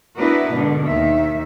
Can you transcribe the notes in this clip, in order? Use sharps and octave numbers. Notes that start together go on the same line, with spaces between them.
B3 D4 E4 F#4 A#4 B4
G#2 B2 D3 D4
D#2 D#3 E5